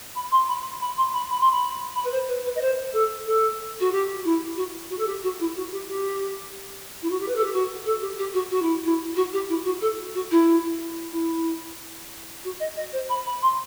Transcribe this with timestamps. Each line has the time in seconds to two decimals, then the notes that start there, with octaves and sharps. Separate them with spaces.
0.15 B5
0.31 C6
0.48 B5
0.80 B5
0.96 C6
1.12 B5
1.29 B5
1.40 C6
1.51 B5
1.95 B5
2.04 B4
2.11 C5
2.28 B4
2.44 B4
2.55 D#5
2.61 C5
2.92 A4
3.26 A4
3.80 F#4
3.91 G4
4.24 E4
4.56 F#4
4.90 F#4
4.98 A4
5.06 G4
5.22 F#4
5.39 E4
5.56 F#4
5.72 G4
5.87 G4
7.02 E4
7.10 F#4
7.19 G4
7.28 B4
7.35 A4
7.43 G4
7.52 F#4
7.85 A4
8.01 G4
8.18 G4
8.33 F#4
8.50 F#4
8.61 E4
8.84 E4
9.16 F#4
9.32 G4
9.49 E4
9.64 F#4
9.80 A4
10.14 F#4
10.30 E4
11.11 E4
12.44 F#4
12.59 D#5
12.76 D#5
12.92 C5
13.09 B5
13.26 B5
13.42 C6